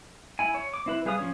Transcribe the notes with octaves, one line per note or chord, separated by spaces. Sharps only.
E4 G#5
C#5
D6
C4 E4 B4
G3 G#4 B4 F5 D#6
F3 C#4 C#5